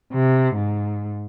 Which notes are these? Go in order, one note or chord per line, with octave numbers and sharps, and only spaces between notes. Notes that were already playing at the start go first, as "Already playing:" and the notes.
C3
G#2